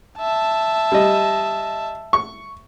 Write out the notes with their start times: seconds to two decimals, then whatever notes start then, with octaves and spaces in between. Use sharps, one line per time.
0.19 E5 A5
0.92 G3 D#5
2.13 C#6